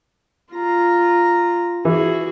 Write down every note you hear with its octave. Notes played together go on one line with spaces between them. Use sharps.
F4 A#5
E3 F#4 G#4